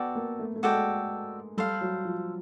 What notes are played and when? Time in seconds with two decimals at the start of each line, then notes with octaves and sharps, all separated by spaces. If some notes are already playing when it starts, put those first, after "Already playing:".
Already playing: B3 F#4 A4 D5 G5
0.15 A#3
0.39 A3
0.56 A3
0.63 G#3 F#4 A4 D5 G5
1.57 G3 A4 C5 F5
1.81 F#3
2.05 F3